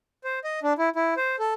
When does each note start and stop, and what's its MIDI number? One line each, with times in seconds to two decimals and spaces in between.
0.24 0.39 72
0.44 0.60 75
0.63 0.73 62
0.78 0.89 64
0.96 1.14 64
1.17 1.36 72
1.39 1.54 69